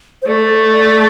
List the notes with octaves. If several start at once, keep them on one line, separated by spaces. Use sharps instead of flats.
C5
A3 D5
D5